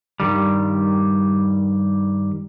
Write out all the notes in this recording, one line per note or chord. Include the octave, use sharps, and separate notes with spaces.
G2 D#3 G3